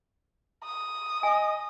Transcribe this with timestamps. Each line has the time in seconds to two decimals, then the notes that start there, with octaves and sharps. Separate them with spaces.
0.64 D#6
1.23 D#5 G#5